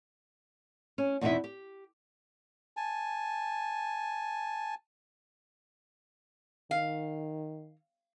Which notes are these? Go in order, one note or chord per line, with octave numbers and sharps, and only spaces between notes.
C#4
E2 B2 C4 D#4 E4 E5
G4
G#5 A5
D#3 F5